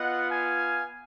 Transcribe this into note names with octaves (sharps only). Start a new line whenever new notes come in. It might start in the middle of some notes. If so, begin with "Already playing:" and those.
Already playing: B3 F4 D#5 F#5
F5 G#5